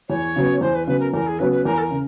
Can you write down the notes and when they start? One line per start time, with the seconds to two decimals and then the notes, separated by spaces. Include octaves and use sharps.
0.09 E2 C#5
0.36 C#3 F#3 B3
0.61 E2 C5
0.75 B4
0.87 C#3 F#3 B3 B4
1.00 A#4
1.13 E2 A#4
1.27 G#4
1.39 C#3 F#3 B3 B4
1.52 B4
1.65 E2 A#4
1.78 A4
1.82 A#4
1.91 C#3